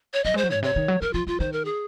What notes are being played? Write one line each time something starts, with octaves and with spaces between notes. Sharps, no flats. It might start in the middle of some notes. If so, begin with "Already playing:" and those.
C#5
F#3 D#5
G#3 C5
F#3
G#2 C#5
C3 C#5
D#3
F#3
F3 A#4
F3 F4
F3 F4
D#3 C5
A#4
G#4